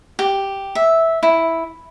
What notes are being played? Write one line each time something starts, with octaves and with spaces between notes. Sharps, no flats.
G4
E5
E4